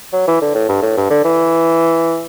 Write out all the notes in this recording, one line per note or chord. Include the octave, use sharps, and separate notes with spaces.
F#3
E3
D3
A2
G2
A2
G2
D3
E3